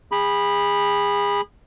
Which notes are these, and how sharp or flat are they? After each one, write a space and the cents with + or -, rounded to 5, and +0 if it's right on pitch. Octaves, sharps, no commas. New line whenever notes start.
G#4 -30 B5 -10